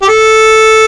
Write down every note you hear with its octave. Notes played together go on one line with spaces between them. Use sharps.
G4
A4